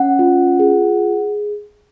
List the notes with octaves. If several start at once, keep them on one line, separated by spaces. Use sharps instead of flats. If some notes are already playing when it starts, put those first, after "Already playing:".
Already playing: C#4 F#5
F4
G#4